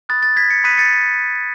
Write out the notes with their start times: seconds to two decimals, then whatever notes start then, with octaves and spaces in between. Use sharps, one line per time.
0.09 B5 D#6 F#6 A6
0.23 A6
0.36 G#6 B6
0.50 A6 C#7
0.64 B5 D#6 F#6 B6 D#7
0.78 A6 C#7